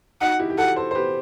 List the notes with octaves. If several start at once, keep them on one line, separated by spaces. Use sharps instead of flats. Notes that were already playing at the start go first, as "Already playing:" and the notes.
D#4 F#4 F#5
E4 G4
G4
F#4 A4 F#5
A4 C5
C5
G4 B4